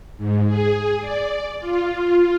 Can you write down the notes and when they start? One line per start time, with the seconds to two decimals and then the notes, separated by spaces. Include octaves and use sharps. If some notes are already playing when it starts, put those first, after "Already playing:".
0.17 G#2
0.46 G#4
1.00 D5
1.60 F4